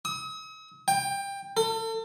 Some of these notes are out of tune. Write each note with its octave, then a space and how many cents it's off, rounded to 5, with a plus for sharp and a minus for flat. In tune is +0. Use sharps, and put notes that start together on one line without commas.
D#6 +45
G5 +20
A4 +35